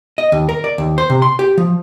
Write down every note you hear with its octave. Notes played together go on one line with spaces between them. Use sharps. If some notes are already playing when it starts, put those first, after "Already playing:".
D#5
D#2
A#4
D5
D#2
C5
C3
C6
G4
F3